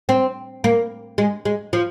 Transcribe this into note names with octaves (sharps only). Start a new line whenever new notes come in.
C4
A#3
G#3
G#3
F3